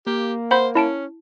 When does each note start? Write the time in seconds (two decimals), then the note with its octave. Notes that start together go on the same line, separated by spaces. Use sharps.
0.07 A#3 G4
0.51 C5 F#5 B5 G6
0.75 C#4 E4 A5 D7